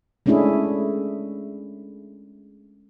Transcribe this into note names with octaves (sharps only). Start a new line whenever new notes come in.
G#3 A3 C#4 D4 E4 G#4